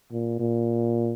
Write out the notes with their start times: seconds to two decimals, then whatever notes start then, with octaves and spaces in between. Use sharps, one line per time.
0.11 A#2
0.39 A#2